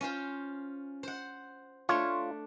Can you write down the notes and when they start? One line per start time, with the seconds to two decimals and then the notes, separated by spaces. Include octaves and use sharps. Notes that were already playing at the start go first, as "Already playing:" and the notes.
0.01 C#4 F4 C5
1.03 C5 F#5
1.89 A3 D4 F4 C#5